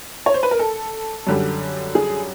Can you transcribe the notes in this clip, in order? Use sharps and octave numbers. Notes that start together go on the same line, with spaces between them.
C#5
C5
B4
A#4
A4
F#2 D3 G3
G#4